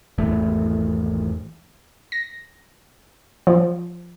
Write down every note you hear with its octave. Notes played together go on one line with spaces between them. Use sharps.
G#1 E2 E3 A3
A#6
F3